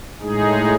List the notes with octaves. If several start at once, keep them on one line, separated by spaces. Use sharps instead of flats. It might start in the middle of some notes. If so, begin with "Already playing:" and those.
A2 G#3 D#4 G#4